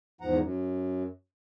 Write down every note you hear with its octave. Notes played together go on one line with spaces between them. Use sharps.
E2 G#2 F3 F#5 A#5
F#2